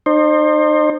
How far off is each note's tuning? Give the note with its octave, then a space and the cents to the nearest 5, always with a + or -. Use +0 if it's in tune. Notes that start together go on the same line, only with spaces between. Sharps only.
D#4 -40 C5 +20